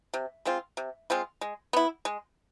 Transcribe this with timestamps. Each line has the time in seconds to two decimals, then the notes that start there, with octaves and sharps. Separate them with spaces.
0.14 C3
0.45 G#3 C4 F4
0.77 C3
1.10 G#3 C4 F4
1.41 G#3
1.73 B3 E4
2.05 G#3